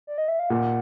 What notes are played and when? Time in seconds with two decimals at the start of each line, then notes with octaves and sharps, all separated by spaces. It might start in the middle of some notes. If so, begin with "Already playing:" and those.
0.07 D5
0.18 D#5
0.28 E5
0.39 F5
0.50 A#2 F#5